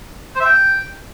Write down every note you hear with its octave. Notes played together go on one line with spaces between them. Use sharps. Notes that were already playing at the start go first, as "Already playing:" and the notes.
C5
E5
G5